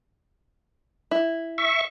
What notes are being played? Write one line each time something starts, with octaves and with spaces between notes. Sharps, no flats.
E4
E5 C#6